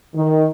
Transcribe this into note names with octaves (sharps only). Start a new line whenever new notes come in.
D#3